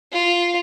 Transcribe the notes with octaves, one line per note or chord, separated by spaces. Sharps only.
F4